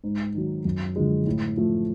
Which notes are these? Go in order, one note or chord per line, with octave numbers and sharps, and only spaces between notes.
G#2
D#3 F#3
F#2
D3 F3 G#3
A2
F3 A3